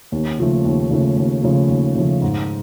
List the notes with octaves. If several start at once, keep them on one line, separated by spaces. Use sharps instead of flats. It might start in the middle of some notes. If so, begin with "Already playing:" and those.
D#2
C#3 F3 A3
D#2
C#3 F3 A3
D#2
C#3 F3 A3
D#2
C#3 F3 A3
G#2